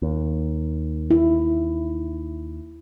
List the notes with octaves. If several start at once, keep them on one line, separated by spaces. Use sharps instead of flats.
D#2
E4